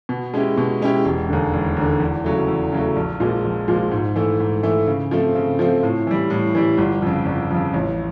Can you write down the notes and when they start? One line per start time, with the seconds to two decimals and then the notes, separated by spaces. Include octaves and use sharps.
0.09 B2
0.34 G#3 C#4 E4 G4
0.58 B2
0.82 G#3 C#4 E4 G4
1.05 E1
1.29 D#2 D3
1.54 E1
1.77 D#2 D3
2.00 E2
2.24 C#3 F#3 A3
2.48 E2
2.72 C#3 F#3 A3
2.96 A#1
3.20 A#2 F3 G#3
3.45 A#1
3.68 A#2 F3 G#3
3.91 G#2
4.16 E3 A3
4.40 G#2
4.63 E3 A3
4.87 C#3
5.11 F3 A3 C4
5.35 C#3
5.59 F3 A3 C4
5.83 A2
6.07 E3 G3
6.30 A2
6.55 E3 G3
6.78 G1
7.02 F2 C#3
7.26 G1
7.51 F2 C#3
7.74 A1